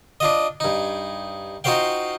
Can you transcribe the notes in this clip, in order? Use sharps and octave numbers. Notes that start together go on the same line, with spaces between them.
D4 F4 D#5
G2 D#4
D#4 F4 F#4 C5 F5 G5